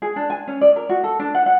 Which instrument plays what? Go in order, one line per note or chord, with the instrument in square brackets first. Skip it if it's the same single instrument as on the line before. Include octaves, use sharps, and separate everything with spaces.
[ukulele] G#4
D4
G#5
C#4
D5
A#4
F#4
A4
D4
F#5
F#5